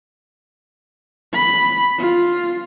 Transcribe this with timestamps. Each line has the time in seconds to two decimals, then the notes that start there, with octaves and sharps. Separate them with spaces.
1.33 B5
1.99 F4